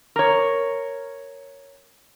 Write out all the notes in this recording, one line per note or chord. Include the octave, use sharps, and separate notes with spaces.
A#4 C#5